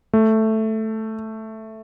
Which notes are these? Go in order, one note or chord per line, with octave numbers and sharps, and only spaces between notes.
A3